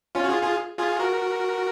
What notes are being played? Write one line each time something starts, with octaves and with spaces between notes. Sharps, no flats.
C#4 F4
F#4
F4 G#4
F4 G#4
F4 G#4
F#4 A#4